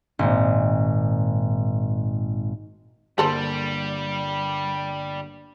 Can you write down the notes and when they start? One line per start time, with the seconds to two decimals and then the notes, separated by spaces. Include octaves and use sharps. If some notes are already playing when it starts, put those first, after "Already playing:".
0.19 G#1 A#2
3.18 G1 G3 A#3 G#4 A4 C5